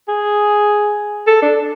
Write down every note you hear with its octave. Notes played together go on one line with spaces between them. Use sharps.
G#4
A4
D4